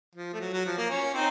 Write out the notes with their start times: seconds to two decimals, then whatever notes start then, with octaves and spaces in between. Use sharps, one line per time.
0.15 F3
0.33 A3
0.41 F#3
0.53 F#3
0.66 F3
0.77 A#3
0.90 C#4
1.14 C4 D#4